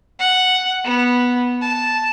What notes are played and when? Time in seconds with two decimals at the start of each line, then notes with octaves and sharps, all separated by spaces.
0.19 F#5
0.84 B3
1.61 A5